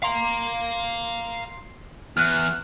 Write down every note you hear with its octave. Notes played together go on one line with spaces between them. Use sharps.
F5 A#5 C6 C7
E2 F6 F#6